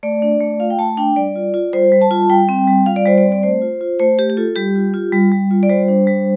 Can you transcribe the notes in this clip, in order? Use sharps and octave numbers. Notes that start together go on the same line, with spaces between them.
A3 D5
D4
A3
F4 F5
G5
A3 A5
D4 G5
G3 D5
F4
F4
G3 C5
G3
A5
F4
G3 G5
C4
G3
F4 F5
D5
G3 C5
D5
C4
D5
A3 C5
F4
F4
A3 C5
A3 G4
G4
F4 A4
G3 G4
F4
F4
G3
G3
F4
D5
G3 C5
D4
G3